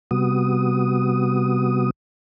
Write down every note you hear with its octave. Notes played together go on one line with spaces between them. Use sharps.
C3 G3 B3 F#4 D#6